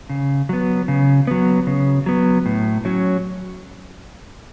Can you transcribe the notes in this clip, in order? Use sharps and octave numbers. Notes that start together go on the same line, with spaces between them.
C#3
F#3 B3
C#3
F#3 B3
C#3
F#3 B3
A2
F#3 C#4